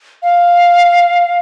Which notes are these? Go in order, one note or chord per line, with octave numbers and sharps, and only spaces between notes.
F5